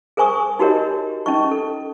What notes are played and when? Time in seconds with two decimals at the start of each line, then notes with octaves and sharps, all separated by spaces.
0.17 G#4 A#4 C5 G#5 C#6 D#6
0.59 D#4 F#4 G4 A#4 C#5 D#5
1.26 C#4 D#4 D#5 C#6
1.51 A4